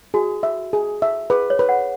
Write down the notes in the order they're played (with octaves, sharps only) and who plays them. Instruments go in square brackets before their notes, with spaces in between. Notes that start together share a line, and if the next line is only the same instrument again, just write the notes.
[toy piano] F#4 [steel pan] G#4
[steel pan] E5
G#4
E5
[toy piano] G#4 [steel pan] B4
[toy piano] C#5
[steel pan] B4
[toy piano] F#5